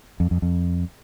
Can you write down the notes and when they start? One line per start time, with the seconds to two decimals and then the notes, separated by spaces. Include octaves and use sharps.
0.20 F2
0.31 F2
0.42 F2